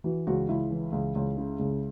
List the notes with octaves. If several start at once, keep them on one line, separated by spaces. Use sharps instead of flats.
E3 F#4
C#2 F#4
C#2 E4
E3
C#2
C#2
C#3
C#2